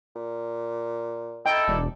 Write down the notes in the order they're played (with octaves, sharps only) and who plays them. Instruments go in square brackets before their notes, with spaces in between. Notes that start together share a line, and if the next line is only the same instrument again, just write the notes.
[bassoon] A#2
[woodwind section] D#4 E4 A4 [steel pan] G5
[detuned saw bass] E1 [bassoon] D4